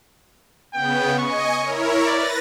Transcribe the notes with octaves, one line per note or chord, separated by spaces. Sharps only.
C#3 B3 G5
D#5 G#5 C#6
E4 A#4 C#5
B4 D5 A6 A#6